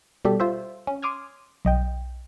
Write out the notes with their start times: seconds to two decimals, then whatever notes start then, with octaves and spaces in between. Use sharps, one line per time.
0.25 B2 G3 G4 A4
0.40 F4 C5 E5
0.87 C#4
1.02 C6 D6 D#6 F6 G#6
1.65 B1 D#5 G5